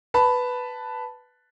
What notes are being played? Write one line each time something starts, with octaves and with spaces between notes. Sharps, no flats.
B4 A5 B5